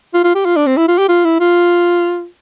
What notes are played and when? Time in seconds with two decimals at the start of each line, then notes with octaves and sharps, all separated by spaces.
0.14 F4
0.24 F4
0.35 G4
0.45 F4
0.56 D4
0.66 C4
0.77 E4
0.88 F4
0.98 G4
1.09 F4
1.25 E4
1.40 F4